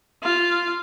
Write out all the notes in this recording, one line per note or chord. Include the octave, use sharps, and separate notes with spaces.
F4